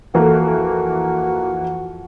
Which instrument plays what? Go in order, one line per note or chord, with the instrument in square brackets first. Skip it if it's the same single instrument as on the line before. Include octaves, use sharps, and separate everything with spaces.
[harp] F2 [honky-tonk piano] E3 A#3 [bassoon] F#4